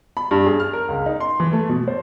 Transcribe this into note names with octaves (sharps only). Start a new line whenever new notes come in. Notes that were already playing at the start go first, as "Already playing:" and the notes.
B5
G2
G#4
F6
A#4
C#2
D#4
C6
E3
A3
B2
C5